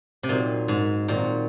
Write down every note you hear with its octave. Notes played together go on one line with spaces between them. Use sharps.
C3
A#2 F#3 C4 D#4
G#2
A#2 D#3 F#3 C4 F#4